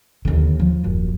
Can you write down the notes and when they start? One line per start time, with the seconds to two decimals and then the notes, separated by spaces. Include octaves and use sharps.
0.25 D#2 D3
0.60 F3
0.84 D#1 F#2